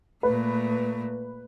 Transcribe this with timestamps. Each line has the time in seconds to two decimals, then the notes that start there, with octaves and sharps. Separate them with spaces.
0.23 A#2 A3 B4